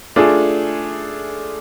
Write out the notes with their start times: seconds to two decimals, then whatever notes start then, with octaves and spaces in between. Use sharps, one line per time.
0.16 A3 D4 F4 G#4